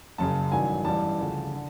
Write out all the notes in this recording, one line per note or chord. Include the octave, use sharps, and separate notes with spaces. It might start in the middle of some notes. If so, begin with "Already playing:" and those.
F#1 F#2 C#3 A5
A1 G2 D#3 F#3 G#5
A1 G2 E3 G3 A5
D2 C#3 F3
D3